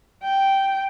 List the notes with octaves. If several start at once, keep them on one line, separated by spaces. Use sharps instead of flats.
G5